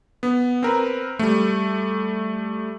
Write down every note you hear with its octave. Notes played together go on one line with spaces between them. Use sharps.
B3
C4 A#4 B4
G3 A3